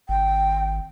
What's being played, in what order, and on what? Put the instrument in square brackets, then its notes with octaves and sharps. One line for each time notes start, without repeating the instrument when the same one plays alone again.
[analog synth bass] G#1 [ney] G5